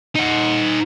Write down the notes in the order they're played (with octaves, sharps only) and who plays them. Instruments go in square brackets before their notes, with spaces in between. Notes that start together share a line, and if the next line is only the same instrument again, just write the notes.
[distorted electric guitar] D#4 F#5